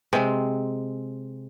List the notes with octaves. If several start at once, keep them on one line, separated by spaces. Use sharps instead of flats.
C3 G#3 C4